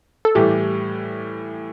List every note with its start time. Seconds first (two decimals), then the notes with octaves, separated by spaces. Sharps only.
0.25 A4
0.35 A2 E3 G3 G4